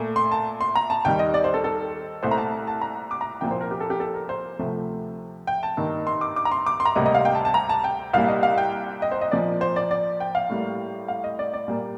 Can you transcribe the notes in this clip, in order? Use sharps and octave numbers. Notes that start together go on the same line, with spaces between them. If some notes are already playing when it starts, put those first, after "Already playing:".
Already playing: A#2 A3
C6
A5
C6
A#5
A5
D#2 D#3 G3 G5
D#5
D5
C5
A4
A4
C2 A#2 A3 C5
A#5
A5
A5
A#5
D6
A#5
C2 A#2 F3 A#3 G5
C5
A#4
G4
A4
G4
A4
A#4
C5
D2 C3 F3 A3
G5
A5
G2 D#3 A#3
C6
D6
D6
A#5
C6
D6
C6
A#5
D2 C3 G3 A#3 D#5
D#5
F5
G5
A5
A5
A#5
A5
G5
C2 A#2 G3 A#3 F5
D#5
F5
G5
D#5
C5
D#5
A#2 F3 A#3 D5
C5
D5
D5
G5
F5
A2 G3 A#3
F5
D#5
D5
D5
A#2 G3 A#3